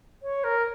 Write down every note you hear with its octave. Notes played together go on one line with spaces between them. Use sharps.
C#5
A#4